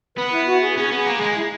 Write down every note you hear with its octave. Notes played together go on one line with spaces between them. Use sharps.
B3 B4
E4
F#4
G#4
C#4 G#4
B3 G#4
A#3
G#4
G#3
E4